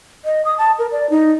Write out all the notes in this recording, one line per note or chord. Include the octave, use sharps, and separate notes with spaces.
D#5
D#6
A5
A#4
D5
D#4